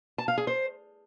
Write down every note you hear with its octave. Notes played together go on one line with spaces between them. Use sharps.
A5
F5
G#4
C5